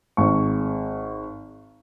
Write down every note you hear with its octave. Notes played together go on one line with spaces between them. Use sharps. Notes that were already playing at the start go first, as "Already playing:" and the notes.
G#1 C#6